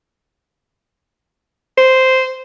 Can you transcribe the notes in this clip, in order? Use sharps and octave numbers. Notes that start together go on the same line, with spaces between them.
C5